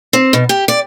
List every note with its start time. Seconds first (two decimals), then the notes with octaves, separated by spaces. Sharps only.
0.13 C4
0.33 B2
0.49 G4
0.68 D5